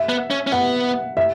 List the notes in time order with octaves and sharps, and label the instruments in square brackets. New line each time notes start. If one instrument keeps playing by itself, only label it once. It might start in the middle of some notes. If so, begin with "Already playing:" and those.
Already playing: [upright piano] E5
[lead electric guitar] B3
C#4
C#4
[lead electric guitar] B3 [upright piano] F#5
[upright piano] E5